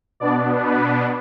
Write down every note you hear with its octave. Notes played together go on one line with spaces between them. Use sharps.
B2 B3 D4 D5
B4